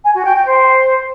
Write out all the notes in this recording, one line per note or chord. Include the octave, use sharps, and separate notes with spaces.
G#5
F#4
G5
G5
C5